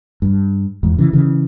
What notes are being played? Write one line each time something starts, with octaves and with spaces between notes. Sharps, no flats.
G2
E2 G#2
C#3 E3
C#3 E3